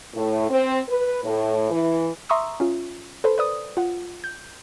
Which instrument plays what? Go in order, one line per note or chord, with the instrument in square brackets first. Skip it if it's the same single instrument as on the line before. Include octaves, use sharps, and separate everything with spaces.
[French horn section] A2
C4
B4
A2
E3
[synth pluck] E5 A#5 C6 C#6 D#6 E6
C#4 F4
A4 B4 C5
B4 D5 D#6
F4 F#5
G6